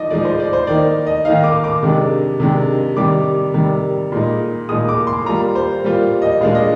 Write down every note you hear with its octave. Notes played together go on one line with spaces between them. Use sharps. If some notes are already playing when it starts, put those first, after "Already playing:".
Already playing: F3 D#4 D5 D#5
F3 G#3 D#4 D5
C5
D5
C5
D#3 A#3 D#4 D5
D#5
D#3 A#3 D#4 F5
D6
D6
C3 D#3 G#3 D4
C3 D#3 G#3 D4
C3 D#3 G3 D6
C3 D#3 G3
A#2 G#3 D#4
A#2 G#3 D#4 D#6
D6
C6
G3 A#3 F4 A#5
C5
G3 A#3 F4
D#5
A#2 G#3 D4 F5
D#5